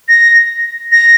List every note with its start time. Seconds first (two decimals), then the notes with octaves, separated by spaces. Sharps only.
0.09 A#6
0.92 A#6